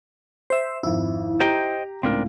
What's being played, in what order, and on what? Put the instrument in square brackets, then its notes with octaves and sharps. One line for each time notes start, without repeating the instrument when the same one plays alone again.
[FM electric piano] C5 E5
[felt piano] G#1 F2 [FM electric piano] E4
[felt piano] G4 A#5 [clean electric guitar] C5 D#5 G5
[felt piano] C#2 A2 [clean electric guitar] C4 D4 A#4